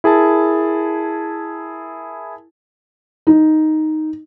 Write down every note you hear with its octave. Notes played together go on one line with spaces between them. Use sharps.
E4 G#4 A#4 A5
D#4